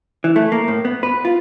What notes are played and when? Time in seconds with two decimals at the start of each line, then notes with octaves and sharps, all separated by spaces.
0.24 E3
0.36 A3
0.52 A#3
0.68 A2
0.85 B3
1.03 B4
1.25 F4